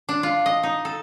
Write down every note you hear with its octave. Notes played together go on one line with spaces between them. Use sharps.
D4
F4
D#5
D#4
A4